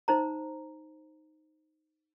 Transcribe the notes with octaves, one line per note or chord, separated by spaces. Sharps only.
D#4 C5 A#5